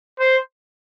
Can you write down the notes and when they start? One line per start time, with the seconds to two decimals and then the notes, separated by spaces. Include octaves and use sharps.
0.19 C5